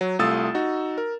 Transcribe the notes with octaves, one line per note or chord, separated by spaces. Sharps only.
F#3
C2 A3 F4 D#6 E6 A6
D#4 F#4
A#4